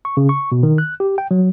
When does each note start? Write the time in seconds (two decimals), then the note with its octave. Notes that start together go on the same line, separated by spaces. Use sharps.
0.05 C#6
0.17 C#3
0.29 C#6
0.52 B2
0.63 D#3
0.78 F#6
1.00 G4
1.18 G5
1.31 F#3